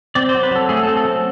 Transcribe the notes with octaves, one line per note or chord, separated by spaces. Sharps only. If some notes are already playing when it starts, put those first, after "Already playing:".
C4 D5
C5
F#3
B4
F#3 A4
A3 G#4
A4
C4
A4
F#3